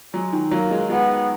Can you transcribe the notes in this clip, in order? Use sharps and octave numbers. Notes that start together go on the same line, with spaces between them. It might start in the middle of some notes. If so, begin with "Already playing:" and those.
F#3 G#3
D#3
F#3 A#3
G#3
G#3 B3